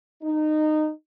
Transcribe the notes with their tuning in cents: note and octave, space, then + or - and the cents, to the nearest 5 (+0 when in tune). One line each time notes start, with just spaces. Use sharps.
D#4 -20